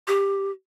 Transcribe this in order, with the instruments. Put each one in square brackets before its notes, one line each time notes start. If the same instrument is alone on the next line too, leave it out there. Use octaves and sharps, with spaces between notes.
[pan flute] G4